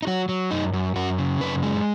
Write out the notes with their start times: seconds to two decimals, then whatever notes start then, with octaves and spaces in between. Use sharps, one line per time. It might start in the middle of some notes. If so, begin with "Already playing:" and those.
0.02 D#4
0.07 F#3 F#4
0.29 F#3
0.51 F#2 D#4
0.73 F#2
0.96 F#2 F#4
1.18 C#3
1.40 F#2 B4
1.63 G#3